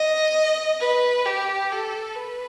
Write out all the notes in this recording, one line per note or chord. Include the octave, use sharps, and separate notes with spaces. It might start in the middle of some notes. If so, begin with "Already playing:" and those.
Already playing: D#5
B4
G4
A4
B4